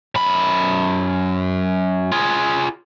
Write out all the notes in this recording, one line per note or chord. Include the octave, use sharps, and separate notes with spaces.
F#2 B5
F4 G#4